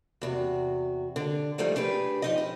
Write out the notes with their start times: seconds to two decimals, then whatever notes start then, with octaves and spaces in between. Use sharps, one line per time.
0.21 E2 C3 F#4
1.16 D3
1.58 F3 G3 A3 A#3 D#4
1.76 D4 G4 G#4 B4
2.22 F3 D#4 D#5
2.38 E4